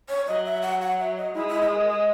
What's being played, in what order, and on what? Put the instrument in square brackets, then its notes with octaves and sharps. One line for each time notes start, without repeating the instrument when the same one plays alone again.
[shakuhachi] C#5
[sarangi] F#3 [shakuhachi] D#5
[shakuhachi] E5
F#5
F#5
E5
D#5
[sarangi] G#3 [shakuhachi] E4
[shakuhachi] E4
E4
A#4
G#4